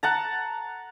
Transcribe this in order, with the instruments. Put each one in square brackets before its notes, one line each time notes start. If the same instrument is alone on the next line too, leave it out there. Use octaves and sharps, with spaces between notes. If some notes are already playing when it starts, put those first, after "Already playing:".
[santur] F#5 A5 A#5